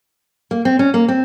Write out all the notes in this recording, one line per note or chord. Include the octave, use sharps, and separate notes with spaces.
A#3
C4
C#4
A#3
C4